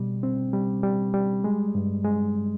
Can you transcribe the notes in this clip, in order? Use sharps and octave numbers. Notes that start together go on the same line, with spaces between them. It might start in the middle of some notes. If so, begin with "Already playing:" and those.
Already playing: B2 G3
C4
G3
G3
G3
G#3
G2
G#3